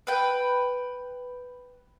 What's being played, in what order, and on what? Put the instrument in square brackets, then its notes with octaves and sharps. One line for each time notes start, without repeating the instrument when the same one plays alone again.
[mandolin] B4 G5